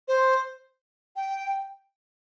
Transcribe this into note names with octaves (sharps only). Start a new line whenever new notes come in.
C5
G5